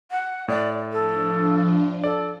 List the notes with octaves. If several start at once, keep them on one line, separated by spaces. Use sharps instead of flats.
F#5
A2 D5
F3 D4 F4 A4
A4 D5